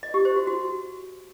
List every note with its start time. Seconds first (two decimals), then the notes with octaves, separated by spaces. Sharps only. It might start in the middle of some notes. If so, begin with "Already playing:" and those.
0.03 D#5
0.14 G4
0.25 C5
0.36 F#4
0.47 F#4